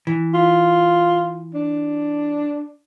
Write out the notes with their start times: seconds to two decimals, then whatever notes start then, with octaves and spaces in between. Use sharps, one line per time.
0.07 E3
0.34 F4
1.55 D4